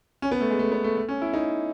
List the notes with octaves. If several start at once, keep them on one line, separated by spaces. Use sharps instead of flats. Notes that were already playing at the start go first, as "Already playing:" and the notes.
C#4
B3
A3
G#3
A3
B3
A3
A3
C#4
E4
D#4